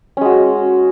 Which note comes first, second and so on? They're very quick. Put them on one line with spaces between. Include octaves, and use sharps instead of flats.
C#4 G#3 F#4